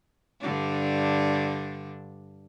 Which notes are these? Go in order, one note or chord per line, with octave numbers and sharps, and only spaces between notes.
G2 D3 D4